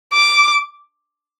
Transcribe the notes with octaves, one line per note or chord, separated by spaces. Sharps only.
D6